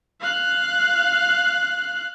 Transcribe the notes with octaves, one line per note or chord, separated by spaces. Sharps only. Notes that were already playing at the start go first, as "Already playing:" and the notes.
F5 F#6